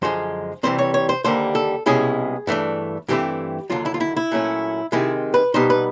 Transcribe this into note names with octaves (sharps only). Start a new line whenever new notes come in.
F#2 D3 F3 G#3 C5
C2 C3 E3 G3 C4 C5
C#5
C#5
C5
D#2 D3 G3 A#3 C5
A4
C2 B2 G#3 C#4 E4 G#4
G2 E3 A3 D4
G2 E3 A3 C4 E4 G4
D#2 D3 F#3 F4
E4
F4
E4
E4
A#2 F#3 A3 C#4
C3 D#3 G#3 E4
B4
B2 G3 B3 D#4 C5
B4